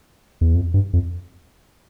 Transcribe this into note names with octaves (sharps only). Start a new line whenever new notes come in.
E2
F2
G2
F2